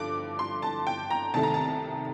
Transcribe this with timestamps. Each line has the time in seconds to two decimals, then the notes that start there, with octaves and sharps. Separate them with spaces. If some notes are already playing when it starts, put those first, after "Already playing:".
Already playing: G2 D3 F3 D6
0.39 C6
0.62 A5
0.87 G5
1.11 A#5
1.34 C2 C3 D#3 A3 A5
1.43 A#5
1.54 A5